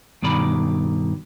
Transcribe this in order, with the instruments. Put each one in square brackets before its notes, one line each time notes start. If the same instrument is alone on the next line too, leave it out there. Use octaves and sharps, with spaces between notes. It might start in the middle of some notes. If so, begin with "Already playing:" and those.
[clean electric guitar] G2 B2 D#3 D5 B5